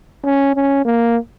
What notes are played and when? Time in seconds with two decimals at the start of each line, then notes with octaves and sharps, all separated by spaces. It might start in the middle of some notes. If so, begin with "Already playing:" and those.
0.24 C#4
0.55 C#4
0.85 A#3